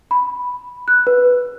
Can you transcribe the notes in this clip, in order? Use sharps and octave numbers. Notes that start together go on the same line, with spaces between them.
B5
F#6
B4